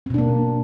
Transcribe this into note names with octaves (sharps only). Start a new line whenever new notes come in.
B2 A#3 C4 D4